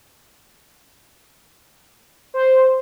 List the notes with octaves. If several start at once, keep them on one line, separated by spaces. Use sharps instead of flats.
C5